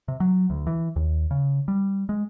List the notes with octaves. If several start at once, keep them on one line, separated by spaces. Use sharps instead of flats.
C3
F#3
D2
E3
D#2
C#3
G3
G#3